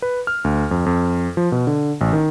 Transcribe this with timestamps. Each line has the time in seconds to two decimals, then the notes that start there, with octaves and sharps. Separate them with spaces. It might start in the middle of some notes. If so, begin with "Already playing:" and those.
0.02 B4
0.27 F6
0.44 D2
0.71 F2
0.86 F2
1.37 F3
1.52 B2
1.67 D3
2.01 A1
2.13 D#3